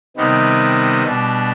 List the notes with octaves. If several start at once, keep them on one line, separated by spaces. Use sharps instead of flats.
C3 D#3 G3 B3 D#4
B2 G3 D4